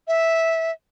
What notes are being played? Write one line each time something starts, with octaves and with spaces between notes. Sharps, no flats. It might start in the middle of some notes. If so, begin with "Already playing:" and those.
E5